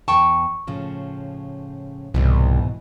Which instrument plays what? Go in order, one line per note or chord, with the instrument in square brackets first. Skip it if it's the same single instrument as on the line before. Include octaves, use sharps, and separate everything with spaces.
[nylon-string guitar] E2 G5 A5 [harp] C#6
[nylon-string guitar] A2 C#3 F3
[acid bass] C2 [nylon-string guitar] G#2 B2 E3